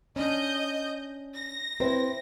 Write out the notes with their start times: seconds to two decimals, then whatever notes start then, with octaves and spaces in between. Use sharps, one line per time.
0.16 C#4 D4 D#5 G6
1.34 A#6
1.80 C4 E4 B4